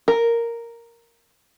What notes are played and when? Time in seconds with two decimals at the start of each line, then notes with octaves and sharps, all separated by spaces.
0.08 A#4